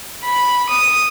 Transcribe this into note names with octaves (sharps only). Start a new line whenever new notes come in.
B5
D#6